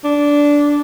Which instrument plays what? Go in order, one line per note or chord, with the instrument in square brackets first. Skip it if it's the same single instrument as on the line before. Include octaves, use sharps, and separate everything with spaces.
[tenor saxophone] D4